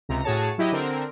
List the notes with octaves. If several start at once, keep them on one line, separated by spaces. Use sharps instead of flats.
C#2 C3 A#5
A2 F#4 G#4 C#5 A5 C#7
F#3 E4 G4 D#5
D3 C4 A#4